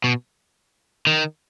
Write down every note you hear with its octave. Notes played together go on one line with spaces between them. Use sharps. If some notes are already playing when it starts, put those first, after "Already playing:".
B2
D#3